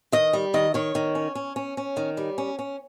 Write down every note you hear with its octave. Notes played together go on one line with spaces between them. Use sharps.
D#3 D#5
G3
D#3 D#5
D#3 C#5
D#3
C#4
C#4
C#4
C#4
D#3
G3
C#4
C#4